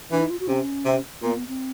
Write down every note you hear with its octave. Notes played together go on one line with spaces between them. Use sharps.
E3 D4
D#4
F4
F#4
C3 C#4
C3
A#2 B3
B3
C4